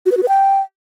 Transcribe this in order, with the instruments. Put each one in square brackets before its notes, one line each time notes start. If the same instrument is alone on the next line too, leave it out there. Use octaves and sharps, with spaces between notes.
[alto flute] F#4
B4
F#4
B4
G5